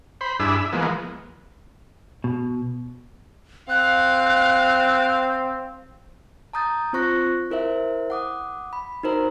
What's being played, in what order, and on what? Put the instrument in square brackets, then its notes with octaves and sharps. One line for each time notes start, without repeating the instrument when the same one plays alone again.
[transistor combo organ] C5 B5
G2 D4 E4 G#4 B5 E6
E5
E3 F3 G#3 A#3 B3
[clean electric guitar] B2
[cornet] C4 [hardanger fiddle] F5 [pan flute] F#6
[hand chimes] A5 A#5 D#6 G6 A6
C4 F4 C5 C#6 F#6 A#6
E4 A#4 C5 E5
F#5 D6 D#6
B5
D#4 F#4 A#4 C5 A#5